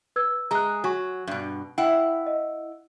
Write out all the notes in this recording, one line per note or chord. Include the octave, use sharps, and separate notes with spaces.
B4 E6 G#6
G#3 G#4 A#5 F#6
F#3 F#4 G#5 C#6
G2 B2
E4 F#5 G5
D#5